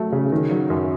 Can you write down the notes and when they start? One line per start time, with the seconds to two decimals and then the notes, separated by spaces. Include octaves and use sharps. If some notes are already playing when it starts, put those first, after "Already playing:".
Already playing: F#3 A3
0.12 C#3
0.32 D#3
0.51 F#3
0.70 F#2